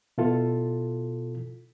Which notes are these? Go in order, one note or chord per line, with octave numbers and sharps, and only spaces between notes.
B2 E4 F4 A4